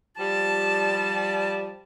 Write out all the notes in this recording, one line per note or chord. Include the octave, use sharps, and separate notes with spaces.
F3 G3 A5